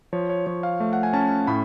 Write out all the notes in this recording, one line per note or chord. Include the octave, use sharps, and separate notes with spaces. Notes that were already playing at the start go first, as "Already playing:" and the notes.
F3 C#5
C#5
F3 C#5
F5
A3
F#5
G#5
C#4 A5
A2 B5